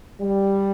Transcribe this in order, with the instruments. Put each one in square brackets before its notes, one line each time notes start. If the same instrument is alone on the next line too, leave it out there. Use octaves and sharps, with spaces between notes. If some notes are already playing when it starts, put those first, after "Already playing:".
[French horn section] G3